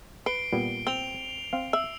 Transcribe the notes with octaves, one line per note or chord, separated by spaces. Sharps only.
B4 C7 D7 G7
A#2 G3 B3
C4 F7 G7
C4 F5
E5 E6